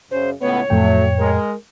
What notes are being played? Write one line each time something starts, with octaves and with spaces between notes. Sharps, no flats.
F#2 C#3 C5
C#2 A2 B3 C#5
F2 A2 F#3 A3 G5
G#3 A#4